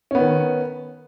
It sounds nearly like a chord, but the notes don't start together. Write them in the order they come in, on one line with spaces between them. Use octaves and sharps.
C#4 B3 D#3